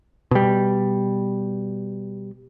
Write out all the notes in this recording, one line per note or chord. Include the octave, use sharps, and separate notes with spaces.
B2 G3